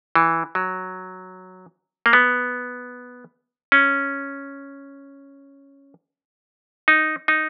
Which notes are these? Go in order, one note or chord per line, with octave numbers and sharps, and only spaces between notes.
E3
F#3
A#3
B3
C#4
D#4
D#4